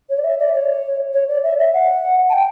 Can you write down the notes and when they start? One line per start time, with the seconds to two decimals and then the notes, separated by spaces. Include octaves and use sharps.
0.09 C#5
0.18 D5
0.24 E5
0.39 D5
0.54 C#5
1.13 C#5
1.29 D5
1.43 E5
1.59 E5
1.73 F#5
2.29 A5
2.33 G5